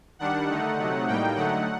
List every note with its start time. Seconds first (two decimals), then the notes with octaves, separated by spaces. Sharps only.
0.19 D#3 G3 D4 F#5
0.49 D3 A3 D#4
0.77 C3 F#3 A3 D#4
1.07 A2 G3 A#3 D#4 G5
1.36 D3 F#3 A3 D#4 F#5